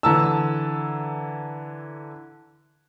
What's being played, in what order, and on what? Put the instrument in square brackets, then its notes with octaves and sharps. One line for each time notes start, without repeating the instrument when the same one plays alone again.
[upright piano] D3 E3 A5 A#5 E6